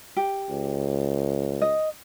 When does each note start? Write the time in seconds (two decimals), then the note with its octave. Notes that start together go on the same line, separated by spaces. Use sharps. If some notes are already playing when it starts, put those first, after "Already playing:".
0.16 G4
0.50 C#2
1.62 D#5